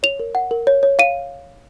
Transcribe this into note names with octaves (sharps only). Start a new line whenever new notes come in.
C#5 F7
A#4
F#5
A#4
C#5
C#5
F5 D#7